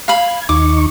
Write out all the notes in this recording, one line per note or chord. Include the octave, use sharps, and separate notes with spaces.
F5 B5 G#6
D#2 D#4 C#6 D6